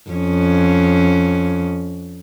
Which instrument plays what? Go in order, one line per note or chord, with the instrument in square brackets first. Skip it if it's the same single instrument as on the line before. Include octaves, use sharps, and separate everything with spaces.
[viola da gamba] F2 C#4